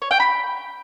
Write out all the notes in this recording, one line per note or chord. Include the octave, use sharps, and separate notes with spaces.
C#5
G5
B5